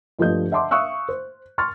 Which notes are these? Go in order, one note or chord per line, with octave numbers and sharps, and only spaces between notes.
G2 F3 A3 D#5 G6
D#5 E5 F#5 A5 C6 D6
E5 F5 C#6 D#6 E6 F#6
C5
C6 C#6 F6 A6